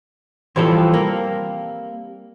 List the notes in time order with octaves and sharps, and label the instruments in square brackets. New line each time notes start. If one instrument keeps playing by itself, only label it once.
[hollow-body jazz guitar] E3 F3 A4 [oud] G3 C4
[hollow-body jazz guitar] A#3